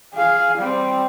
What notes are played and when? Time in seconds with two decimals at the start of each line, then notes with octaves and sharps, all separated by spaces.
0.14 G#4 F5
0.58 G3 C4